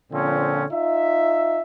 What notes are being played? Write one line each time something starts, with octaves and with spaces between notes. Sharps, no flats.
A#2 D3 F3 C4 C#4
D#4 F4 E5